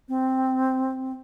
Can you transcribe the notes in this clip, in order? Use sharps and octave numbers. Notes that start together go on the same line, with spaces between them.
C4